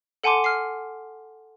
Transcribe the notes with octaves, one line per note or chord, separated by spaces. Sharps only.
A4 F#5 G#5 A5 C6 D6
F6 C7